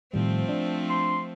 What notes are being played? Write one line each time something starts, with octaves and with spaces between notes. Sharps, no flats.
A2 D#3 F3 G3 A3 C4
D4
C6